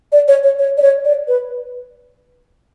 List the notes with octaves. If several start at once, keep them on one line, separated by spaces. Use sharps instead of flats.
D5
C#5
C#5
C#5
D5
C#5
D5
B4